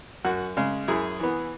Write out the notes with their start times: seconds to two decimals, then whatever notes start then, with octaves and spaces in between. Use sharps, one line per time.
0.25 F#2 F#4
0.57 C#3 G#3
0.88 F#2 E4 G#4
1.20 E3 B3